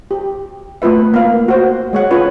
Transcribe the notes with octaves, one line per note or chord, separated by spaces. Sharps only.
G4
A3 B3 F4 B4 E5
A#3 B3 F5
F#4 C5
G#3 C#5 F#5
C#4 F4 B4 C#5